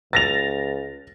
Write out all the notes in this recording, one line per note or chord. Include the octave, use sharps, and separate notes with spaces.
C#2 A6 A#6 F7